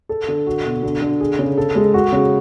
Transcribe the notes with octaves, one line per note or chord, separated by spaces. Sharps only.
A4
D3
F#4
B2
D3
D3
G#4
C#3
A4
G#3
F#4
C#3